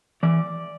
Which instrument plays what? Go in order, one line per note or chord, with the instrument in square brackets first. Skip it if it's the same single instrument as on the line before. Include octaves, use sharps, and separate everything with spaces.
[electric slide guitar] E3 D5